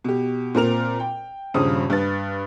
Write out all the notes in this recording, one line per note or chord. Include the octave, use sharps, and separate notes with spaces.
B2 G4
A#2 C4 A#4 F7
G5
D#1 G2 C#3 C5 D#6
G2 B4 A6